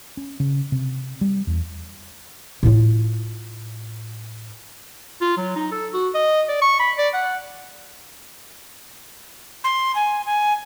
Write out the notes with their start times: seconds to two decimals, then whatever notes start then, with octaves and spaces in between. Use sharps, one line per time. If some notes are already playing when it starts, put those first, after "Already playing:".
0.17 C#4
0.40 C#3
0.72 C3
1.21 G3
1.47 E2
2.63 A2 F4
5.21 F4
5.37 F#3
5.56 D#4
5.72 A4
5.93 F#4
6.14 D#5
6.49 D5
6.62 C#6
6.80 B5
6.98 D5
7.14 F#5
9.64 C6
9.95 G#5
10.26 G#5